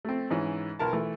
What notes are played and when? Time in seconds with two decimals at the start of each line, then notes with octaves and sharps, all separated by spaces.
0.05 A3 C4
0.30 G#2 E3 C#4
0.79 B1 A#4 A5
0.93 E3 A3